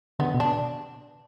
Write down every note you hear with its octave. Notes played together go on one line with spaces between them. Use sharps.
D3 B3
B2
D4